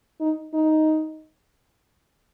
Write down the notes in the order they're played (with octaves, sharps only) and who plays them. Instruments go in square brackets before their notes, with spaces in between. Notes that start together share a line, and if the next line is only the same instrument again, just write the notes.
[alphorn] D#4
D#4